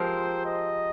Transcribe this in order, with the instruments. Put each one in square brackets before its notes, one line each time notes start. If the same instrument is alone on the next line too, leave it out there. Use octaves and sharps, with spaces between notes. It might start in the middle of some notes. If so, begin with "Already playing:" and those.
Already playing: [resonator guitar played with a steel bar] F3 G#3 C4 G4 A#4 [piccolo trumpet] C5
[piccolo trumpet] D#5